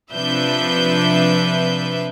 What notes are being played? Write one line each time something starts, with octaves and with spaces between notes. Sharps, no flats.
C3 F3 D4 B4 E5 G6